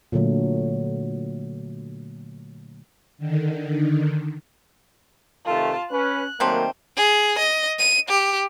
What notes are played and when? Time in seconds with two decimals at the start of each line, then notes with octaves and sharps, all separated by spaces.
0.12 A#2 D3 F#3 A3
3.18 D3 D#3
5.45 C3 D#3 A3 F4 A5
5.91 C#4 B4 F#6
6.40 D#3 F#3 G3 A3 A#3 C4
6.97 G#4
7.38 D#5
7.79 D#7
8.09 G4